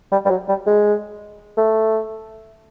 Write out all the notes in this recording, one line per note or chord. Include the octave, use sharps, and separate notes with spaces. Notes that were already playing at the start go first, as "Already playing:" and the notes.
G3
G3
F#3
G3
G#3
A3